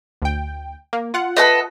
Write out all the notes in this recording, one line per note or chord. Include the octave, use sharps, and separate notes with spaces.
D2 G5
A#3
F4 F#5
A4 B4 D#5